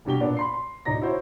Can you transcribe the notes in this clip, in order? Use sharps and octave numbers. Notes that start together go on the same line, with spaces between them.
F1 G2 B2 G4 G7
A#2 B3 D4
B5 C6 C7
C6
D1 D#4 D5 A#5 A#6
E4 F#4 C5 C#5